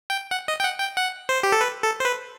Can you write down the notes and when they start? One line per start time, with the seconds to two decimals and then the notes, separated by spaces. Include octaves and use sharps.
0.10 G5
0.31 F#5
0.48 D#5
0.60 G5
0.64 F#5
0.80 G5
0.97 F#5
1.29 C5
1.43 G4
1.52 A4
1.61 B4
1.83 A4
2.00 C5
2.05 B4